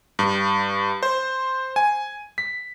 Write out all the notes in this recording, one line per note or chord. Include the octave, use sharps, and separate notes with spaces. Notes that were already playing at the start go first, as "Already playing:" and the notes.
G2
C5
G#5
B6